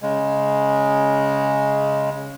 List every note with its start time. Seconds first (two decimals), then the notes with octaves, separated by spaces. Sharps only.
0.02 C#3 G#3